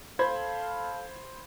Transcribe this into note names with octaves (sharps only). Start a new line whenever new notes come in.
A4 C5 F5 B5 G#6